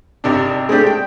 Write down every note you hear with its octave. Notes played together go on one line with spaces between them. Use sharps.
G#1 C3 D4
G#3 A3 C4 D4 G4
G5